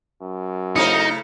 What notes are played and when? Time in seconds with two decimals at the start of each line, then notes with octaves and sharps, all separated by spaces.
0.22 F#2
0.76 C#3 A3 D#4 E4 C5 D#6 C#7